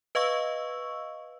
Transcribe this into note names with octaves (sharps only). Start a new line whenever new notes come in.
B4 D#5 F5 C#6 E6